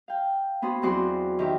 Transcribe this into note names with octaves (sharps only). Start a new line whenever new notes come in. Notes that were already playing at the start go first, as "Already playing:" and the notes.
F5 G5
B3 C#4 F#4 C5
E2 F#3 C4 F#4 D5 C6
D#3 G4 E5